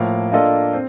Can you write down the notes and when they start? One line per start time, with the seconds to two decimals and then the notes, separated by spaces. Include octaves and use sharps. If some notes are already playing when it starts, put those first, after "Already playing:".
Already playing: A2 F3 A#3
0.32 A#3 D4 F4 A4 D#5
0.73 C4